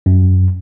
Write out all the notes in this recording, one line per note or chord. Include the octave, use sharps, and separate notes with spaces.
F#2